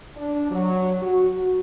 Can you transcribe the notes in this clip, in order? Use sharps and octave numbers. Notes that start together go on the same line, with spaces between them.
D4
F#3
F#4